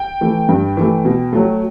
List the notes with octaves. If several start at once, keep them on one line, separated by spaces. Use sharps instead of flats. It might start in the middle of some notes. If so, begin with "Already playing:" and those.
Already playing: G5
E3 A3
G2
E3 A3
B2
F#3 A3